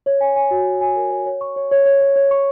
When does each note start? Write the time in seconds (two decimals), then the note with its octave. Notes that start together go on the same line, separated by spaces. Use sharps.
0.06 C#5
0.21 G#5
0.36 G#5
0.51 F#4
0.66 G#5
0.81 G#5
0.96 A#4
1.11 C#5
1.26 C#5
1.41 C#6
1.56 C#5
1.71 C#5
1.86 C#5
2.01 C#5
2.16 C#5
2.31 C#6